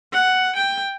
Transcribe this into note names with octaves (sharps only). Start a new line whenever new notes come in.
F#5
G5